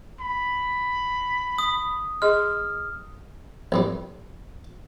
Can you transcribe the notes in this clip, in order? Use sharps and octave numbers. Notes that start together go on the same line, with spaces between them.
B5
D#6
G#4 D#5 C6 F6
A1 F2 G3